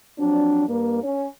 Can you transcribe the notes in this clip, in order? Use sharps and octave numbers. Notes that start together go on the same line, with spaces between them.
F3 F#3 C4 D4
G2 A#3
C#4